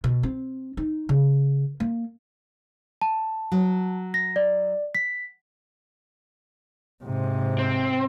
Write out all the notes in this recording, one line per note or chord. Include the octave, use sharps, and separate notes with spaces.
B2
C4
D#4
C#3
A#3
A5
F#3
A#6
D5
B6
G#2 C3
C4